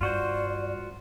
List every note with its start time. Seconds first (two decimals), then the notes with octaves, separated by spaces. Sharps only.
0.01 G2 F4 F#4 C5 D5